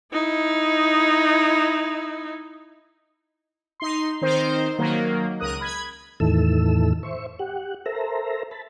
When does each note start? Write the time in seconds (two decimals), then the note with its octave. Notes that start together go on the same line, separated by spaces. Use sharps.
0.13 D#4 E4
3.80 D#4 C6
4.21 D#3 C4 D#4 C5
4.78 D#3 F#3 A#3
5.40 C#2 A#4 D#6 F#6
5.61 B5 G#6
6.20 E2 A2 D#3 E3 A4 E6
7.03 C5 E5 C#6
7.39 G4 F#5
7.86 A4 A#4 C5 E5 A#5
8.51 A5 B5